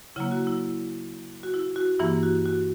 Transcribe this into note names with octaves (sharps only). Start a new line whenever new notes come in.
C#3 F#3 A#3 E4
F#4
E4
F#4
E4
F#4
G2 E3 A#3 E4
F#4
F#4